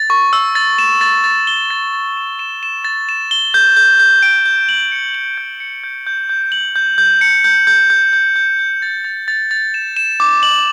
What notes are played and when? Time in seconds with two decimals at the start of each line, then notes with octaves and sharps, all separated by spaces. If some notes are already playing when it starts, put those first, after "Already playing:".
Already playing: A6
0.10 C#6
0.33 E6
0.55 A6
0.78 E7
1.01 A6
1.24 A6
1.47 G7
1.70 A6
1.93 A6
2.17 E7
2.39 E7
2.63 E7
2.85 A6
3.09 E7
3.31 G7
3.54 G6
3.77 G6
4.00 G6
4.22 D7
4.45 G6
4.69 F#7
4.92 C#7
5.14 F#7
5.38 G6
5.60 C#7
5.84 G6
6.07 G6
6.29 G6
6.52 F#7
6.76 G6
6.98 G6
7.21 C#7
7.44 G6
7.67 G6
7.90 G6
8.13 G6
8.36 G6
8.59 G6
8.82 A6
9.04 A6
9.28 A6
9.51 A6
9.74 E7
9.97 E7
10.20 D6
10.43 F#7